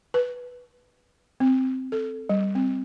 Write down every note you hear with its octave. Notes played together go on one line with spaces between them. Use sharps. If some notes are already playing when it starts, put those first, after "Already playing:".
B4
C4
A4
G3
C4